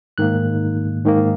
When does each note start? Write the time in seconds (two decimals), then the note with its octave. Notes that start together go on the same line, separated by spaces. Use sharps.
0.18 G#2 D#3 A#3 F#6
1.05 G#2 D#3 A#3